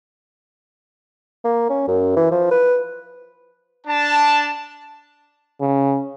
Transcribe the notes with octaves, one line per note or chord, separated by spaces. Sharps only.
A#3
C#4
F#2
E3
F3
B4
D4 A5
C#3